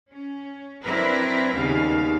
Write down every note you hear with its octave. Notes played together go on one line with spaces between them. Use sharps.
C#4
F#3 C4 D4 E4 A#4 B4
D#2 C#3 G3 B3 F5